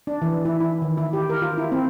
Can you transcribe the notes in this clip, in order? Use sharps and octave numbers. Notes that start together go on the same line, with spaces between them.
D4
E3
E4
E4
D#3
E4
G4
A#4
F4
E4
C4